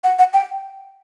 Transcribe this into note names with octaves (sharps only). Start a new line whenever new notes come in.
F#5
F#5
G5